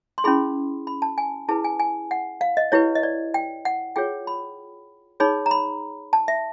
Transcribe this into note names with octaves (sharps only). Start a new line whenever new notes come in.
C6
C#4 E4 G#4 B5
B5
A5
G#5
E4 G#4 B4 A5
G#5
G#5
F#5
F5
D#5
E4 G4 B4 C#5
D#5
D5
G5
F#5
F4 G#4 C#5 G5
B5
D#4 G#4 C#5 B5
A#5
B5
A5
E5